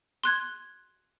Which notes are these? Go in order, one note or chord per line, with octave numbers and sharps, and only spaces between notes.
C6 F#6 G#6